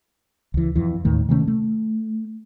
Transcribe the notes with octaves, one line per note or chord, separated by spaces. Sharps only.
C#2 E3
F2 E3
D#2 A2 D#3 A3
C3 D#3 A3 C#4
A3